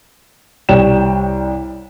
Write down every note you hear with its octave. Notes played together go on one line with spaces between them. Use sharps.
C2 G3 C#5 G5 E7